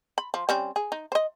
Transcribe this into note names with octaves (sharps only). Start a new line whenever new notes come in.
B5
F3
G3 C4 C#4
G#4
D#4
C5 D#5